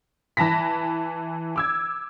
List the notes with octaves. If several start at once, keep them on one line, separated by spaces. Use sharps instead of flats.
E3 A5 B5 A#6 B6
D6 E6 G#6